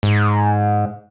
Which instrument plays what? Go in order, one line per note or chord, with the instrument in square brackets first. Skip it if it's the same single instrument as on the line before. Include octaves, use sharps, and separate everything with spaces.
[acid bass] G#2